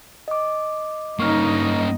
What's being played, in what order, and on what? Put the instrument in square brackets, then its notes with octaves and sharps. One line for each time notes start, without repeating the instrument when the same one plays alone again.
[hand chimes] D#5 D6
[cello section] G2 D#4 D#5 [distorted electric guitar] A#3 C#4 [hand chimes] C#6 F6